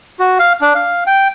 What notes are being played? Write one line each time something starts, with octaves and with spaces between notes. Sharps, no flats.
F#4
F5
D4
F5
G5